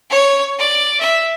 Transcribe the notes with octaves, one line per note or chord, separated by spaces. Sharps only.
C#5
D5
E5